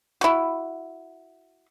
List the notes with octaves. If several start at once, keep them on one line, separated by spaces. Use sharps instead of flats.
E4 F#4